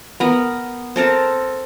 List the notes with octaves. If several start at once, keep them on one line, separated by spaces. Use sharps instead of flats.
B3 A#4
C4 A4 A#4 A5